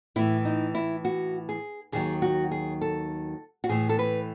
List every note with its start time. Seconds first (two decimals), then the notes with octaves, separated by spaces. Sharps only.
0.16 A2 E3 E4
0.45 D#4
0.75 E4
1.05 F#4
1.49 G#4
1.92 D#2 D#3 F#3 G#4
2.22 F#4
2.51 G#4
2.81 A4
3.64 F#4
3.69 A2 E3 G#4
3.89 A4
3.99 B4